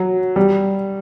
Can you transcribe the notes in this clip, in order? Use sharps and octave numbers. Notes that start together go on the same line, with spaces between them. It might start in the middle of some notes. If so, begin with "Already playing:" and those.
Already playing: F#3
G3